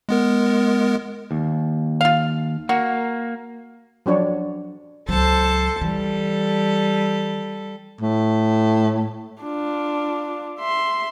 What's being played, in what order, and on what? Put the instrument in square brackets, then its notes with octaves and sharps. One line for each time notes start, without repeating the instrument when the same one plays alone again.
[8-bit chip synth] G#3 B3 A#4
[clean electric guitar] D#2
[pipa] F4 F5
[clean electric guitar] A#3 [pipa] F#4
[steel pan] F3 F#3 D4 C#5
[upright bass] C#2 F#3 [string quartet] A4 C5 A5
[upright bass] E3 [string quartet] G3 A4
[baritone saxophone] A2
[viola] D4 F4
E5 C6